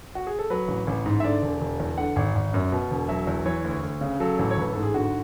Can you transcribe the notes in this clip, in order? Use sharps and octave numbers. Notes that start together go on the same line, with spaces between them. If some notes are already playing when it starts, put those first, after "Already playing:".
F#4
G#4
A4
F#3 B4
A1
A1
G#2
E5
D3 D5
E1
E1
E2
D3 F#5
G#1
G#1
F#2
B2
E1
F#3 E5
E2
E3 C#5
D2
D2
C#3
F#3 A4
A1
C#5
A1 B4
G#2 A4
G#4
D3 F#4